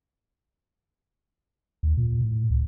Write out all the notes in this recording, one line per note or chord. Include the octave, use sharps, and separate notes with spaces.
D#2
A#2
A2
C#2